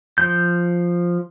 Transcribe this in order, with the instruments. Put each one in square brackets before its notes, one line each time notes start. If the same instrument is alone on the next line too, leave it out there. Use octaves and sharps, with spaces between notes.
[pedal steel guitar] F3 G6